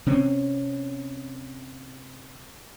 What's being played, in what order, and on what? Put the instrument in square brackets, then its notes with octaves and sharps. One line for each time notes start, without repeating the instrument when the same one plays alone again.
[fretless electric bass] C3 C4 C#4